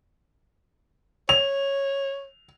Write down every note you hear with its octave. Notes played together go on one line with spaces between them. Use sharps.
C#5 F7